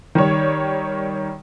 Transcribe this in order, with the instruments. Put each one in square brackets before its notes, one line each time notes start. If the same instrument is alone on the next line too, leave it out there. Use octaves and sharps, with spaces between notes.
[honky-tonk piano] D#3 G3 C#5